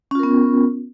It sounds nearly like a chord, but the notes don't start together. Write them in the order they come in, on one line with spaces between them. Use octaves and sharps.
C#4 F4 A#4 B3